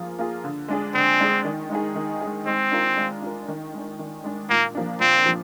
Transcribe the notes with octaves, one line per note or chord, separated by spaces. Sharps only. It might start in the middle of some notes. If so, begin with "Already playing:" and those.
Already playing: F3 A#3 F4 G#4
A#3 F4 G#4
D3
G#3 D4 G#4
D3 C4
G#3 D4 G#4
D#3
G#3 D#4 G#4
D#3
G#3 D#4 G#4
G#3 C4
D4 F4 A#4
G#3
D4 F4 A#4
D#3
G#3 D4
D#3
G#3 D4
A#2 A#3
F3 A#3 D4
A#2 C4
F3 A#3